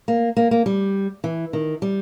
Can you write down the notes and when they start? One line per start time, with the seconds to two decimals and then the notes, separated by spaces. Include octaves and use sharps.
0.08 A#3
0.37 A#3
0.51 A#3
0.66 G3
1.24 E3
1.53 D#3
1.82 G3